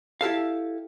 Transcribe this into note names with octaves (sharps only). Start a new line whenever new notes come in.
E4 G4 A4 F5